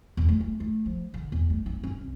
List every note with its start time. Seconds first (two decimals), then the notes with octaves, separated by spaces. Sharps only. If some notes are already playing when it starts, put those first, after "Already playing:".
0.17 E2
0.28 A3
0.40 A3
0.60 A3
0.86 F3
1.14 D3
1.32 E2
1.50 A3
1.66 D4
1.83 C#4
2.01 C2